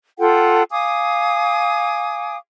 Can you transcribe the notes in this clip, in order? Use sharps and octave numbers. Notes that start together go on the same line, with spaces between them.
F4 A4 F#5 G5
F5 G#5 D6 D#6